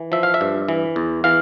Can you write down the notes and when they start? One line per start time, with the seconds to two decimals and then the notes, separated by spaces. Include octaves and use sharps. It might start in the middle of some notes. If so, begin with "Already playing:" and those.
Already playing: E3
0.12 F3 E5
0.23 F5
0.34 E5
0.41 G2
0.68 E3
0.96 E2
1.24 E3 F5